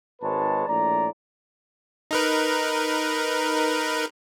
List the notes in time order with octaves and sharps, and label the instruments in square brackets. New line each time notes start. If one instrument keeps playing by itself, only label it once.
[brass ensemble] G#1 G#2 G#3 B4 C#5 A5
A#1 A2 D5 A#5
[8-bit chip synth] D#4 A#4 B4